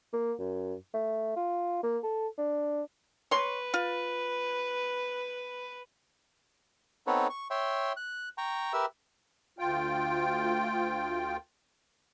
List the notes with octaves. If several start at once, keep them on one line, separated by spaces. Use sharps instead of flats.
A#3
F#2
A3
F4
A#3
A4
D4
B4 C#5 C6
F4
B3 C4 D#4 A4 B4 C#5
C#6
C#5 E5 G5 C6
F#6
G5 A#5 C#6
G4 A#4 B4 E5 E6
D2 F4 G5